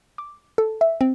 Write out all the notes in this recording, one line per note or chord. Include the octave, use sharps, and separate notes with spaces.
D6
A4
E5
C4